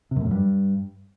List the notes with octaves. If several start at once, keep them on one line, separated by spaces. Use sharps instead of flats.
C3
F#2
A2
F#2
G2